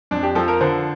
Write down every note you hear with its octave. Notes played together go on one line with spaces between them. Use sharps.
F2 D4
G4
F3 A4
A#4
D3 C5